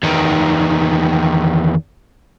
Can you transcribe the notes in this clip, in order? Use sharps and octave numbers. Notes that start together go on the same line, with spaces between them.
E2 D#3